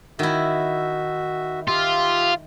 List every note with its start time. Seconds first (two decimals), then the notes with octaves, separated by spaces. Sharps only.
0.19 D#3 E4 F#4 E5
1.68 F4 G4 E5